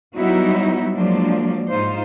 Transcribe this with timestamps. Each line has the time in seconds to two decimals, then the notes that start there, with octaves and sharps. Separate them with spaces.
0.17 F#3 G3 B3 D#4 E4 F#4
0.93 F3 F#3 G#3 A#3 D4
1.70 G#2 D#4 F4 C5